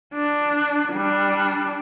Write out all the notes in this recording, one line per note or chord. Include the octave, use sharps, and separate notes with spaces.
D4
G3 D4